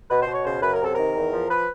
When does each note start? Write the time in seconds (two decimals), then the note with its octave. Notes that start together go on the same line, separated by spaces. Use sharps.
0.10 B2 B4
0.22 C5
0.27 B2
0.33 C#5
0.45 C#3 C5
0.62 F#2 B4
0.73 A#4
0.80 C3 A4
0.94 D#3 A#4
1.16 E2
1.33 F3
1.51 B4